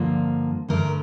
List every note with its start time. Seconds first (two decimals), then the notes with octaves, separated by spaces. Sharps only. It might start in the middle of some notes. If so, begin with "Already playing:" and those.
Already playing: G2 D3 F3 A#3
0.68 G2 D3 A3 A#4